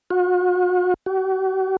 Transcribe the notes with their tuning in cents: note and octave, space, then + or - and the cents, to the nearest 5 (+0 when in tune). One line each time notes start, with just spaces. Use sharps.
F#4 -40
F#4 +45